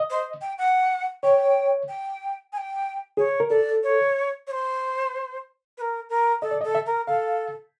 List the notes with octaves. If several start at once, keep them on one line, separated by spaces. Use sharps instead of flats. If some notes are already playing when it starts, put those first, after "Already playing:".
Already playing: D#5
C5
G5
F#5
C#5 G5
G5
G#5
G5
G#4 C#5
A#4
A4 D5
C#5
C#5
C5
B4
A#4
A#4
A4 D#5
D5
D#5
A4
E5
A#4
A4 F5